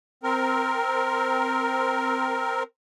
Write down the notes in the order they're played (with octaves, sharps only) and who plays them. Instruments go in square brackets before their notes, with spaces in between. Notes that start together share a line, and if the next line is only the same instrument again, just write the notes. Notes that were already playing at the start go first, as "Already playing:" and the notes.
[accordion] C4 A#4